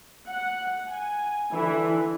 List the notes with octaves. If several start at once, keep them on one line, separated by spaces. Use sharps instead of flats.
F#5
G#5
D3 E3 E4